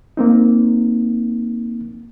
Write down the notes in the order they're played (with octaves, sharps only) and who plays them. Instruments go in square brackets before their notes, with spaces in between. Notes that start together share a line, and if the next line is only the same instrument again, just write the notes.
[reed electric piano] A#3 C4 D#4